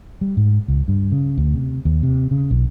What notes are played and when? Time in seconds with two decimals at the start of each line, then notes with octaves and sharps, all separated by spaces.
0.21 G3
0.37 G#2
0.68 C#2
0.88 G2
1.12 C#3
1.38 D2
1.54 C3
1.85 D#2
2.03 C3
2.31 C#3
2.51 B1